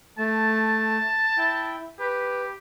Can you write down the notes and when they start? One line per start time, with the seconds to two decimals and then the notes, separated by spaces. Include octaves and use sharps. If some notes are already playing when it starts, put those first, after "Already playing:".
0.19 A3 A5
1.38 E4 G5
2.00 G4 B4